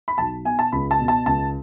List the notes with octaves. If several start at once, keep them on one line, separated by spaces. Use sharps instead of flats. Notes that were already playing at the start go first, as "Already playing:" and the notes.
B5
B1 A5
B2 G#5
A5
C#2 B5
A5
B2
A5
C#2 A5